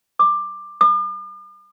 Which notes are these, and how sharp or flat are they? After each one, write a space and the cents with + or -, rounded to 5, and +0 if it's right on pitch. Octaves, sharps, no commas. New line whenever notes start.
D6 +15
D6 +45